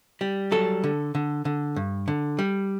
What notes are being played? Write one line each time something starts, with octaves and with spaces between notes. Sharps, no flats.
G3
F#3 A4
D3
D3
D3
G2
D3
G3